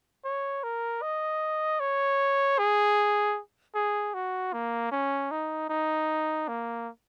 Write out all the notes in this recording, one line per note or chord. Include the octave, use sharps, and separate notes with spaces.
C#5
A#4
D#5
C#5
G#4
G#4
F#4
A#3
C#4
D#4
D#4
A#3